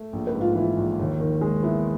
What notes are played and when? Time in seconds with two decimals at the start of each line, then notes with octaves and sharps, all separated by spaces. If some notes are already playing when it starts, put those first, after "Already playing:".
Already playing: A3
0.13 A#1
0.27 B4
0.34 G#2
0.41 F4
0.55 E3 E4
0.77 A#1
0.99 D#2
1.20 D#3
1.41 G#3
1.63 B3 E4